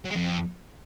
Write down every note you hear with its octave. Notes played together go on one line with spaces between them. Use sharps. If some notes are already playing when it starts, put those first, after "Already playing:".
F#3
G#3
F2